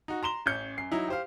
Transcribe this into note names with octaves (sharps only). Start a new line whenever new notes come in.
D#4 F#4
A#5 C6 E7 G7
A1 C#4 G6 C#7
F#2 C7
F#3 D#4 E4
G4 C5 F5